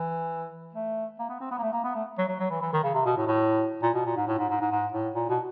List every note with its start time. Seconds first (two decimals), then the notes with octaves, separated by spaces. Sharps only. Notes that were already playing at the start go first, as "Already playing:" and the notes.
Already playing: E3
0.74 A3
1.19 A#3
1.29 B3
1.40 C4
1.51 B3
1.58 A#3
1.62 A3
1.73 A#3
1.84 B3
1.95 A3
2.18 F#3
2.28 F#3
2.39 F#3
2.50 E3
2.61 E3
2.73 D#3
2.83 C#3
2.94 C3
3.05 B2
3.17 A2
3.27 A2
3.82 A#2
3.94 B2
4.05 A#2
4.16 G#2
4.27 A2
4.38 G#2
4.49 G#2
4.60 G#2
4.71 G#2
4.92 A2
5.14 A#2
5.29 B2